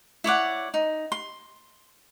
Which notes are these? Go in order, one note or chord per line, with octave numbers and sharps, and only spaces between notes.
E4 C#5 D5 F#5
D#4
C6